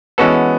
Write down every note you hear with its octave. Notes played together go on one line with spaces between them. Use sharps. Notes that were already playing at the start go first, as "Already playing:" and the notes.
E3 G#3 B3 C#4 F#4 A4